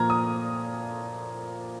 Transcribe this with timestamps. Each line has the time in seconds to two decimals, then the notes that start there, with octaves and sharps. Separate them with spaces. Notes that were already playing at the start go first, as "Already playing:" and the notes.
Already playing: A#2 F3 A#3 A#5 F6 G#6
0.10 D#6